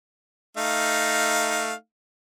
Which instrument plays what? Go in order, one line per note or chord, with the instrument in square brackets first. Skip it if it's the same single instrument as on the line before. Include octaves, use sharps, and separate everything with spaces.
[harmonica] A3 D#4 F5